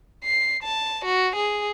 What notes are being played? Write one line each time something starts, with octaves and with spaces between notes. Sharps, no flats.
C7
A5
F#4
G#4